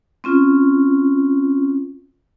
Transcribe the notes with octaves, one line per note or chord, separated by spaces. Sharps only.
C4 C#4 F4